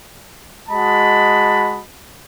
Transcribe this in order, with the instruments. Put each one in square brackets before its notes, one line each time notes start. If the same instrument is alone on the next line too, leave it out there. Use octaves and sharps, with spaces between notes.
[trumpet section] G#3 F#4 D#5 A5 B5